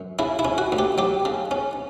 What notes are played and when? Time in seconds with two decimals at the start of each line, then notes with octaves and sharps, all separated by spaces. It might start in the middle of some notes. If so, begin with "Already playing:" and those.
Already playing: F#2
0.19 C#3 E4
0.39 E4
0.45 C#4
0.58 F#4
0.72 D2
0.79 G4
0.98 F#3 G4
1.25 C#3
1.51 C#4